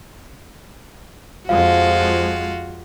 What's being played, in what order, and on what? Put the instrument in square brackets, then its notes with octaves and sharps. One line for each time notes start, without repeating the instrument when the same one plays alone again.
[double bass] F2 G#3 [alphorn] F3 [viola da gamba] F4 F#4 [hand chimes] F5